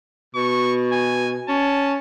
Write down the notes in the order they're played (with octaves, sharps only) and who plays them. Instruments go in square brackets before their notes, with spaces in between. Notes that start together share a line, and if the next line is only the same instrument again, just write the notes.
[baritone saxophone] B2 [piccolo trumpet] C#6
[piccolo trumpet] G#5
[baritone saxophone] C#4 [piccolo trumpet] A5